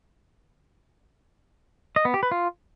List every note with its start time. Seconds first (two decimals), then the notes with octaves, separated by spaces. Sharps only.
1.96 D#5
2.05 B3
2.14 G4
2.23 B4
2.31 F4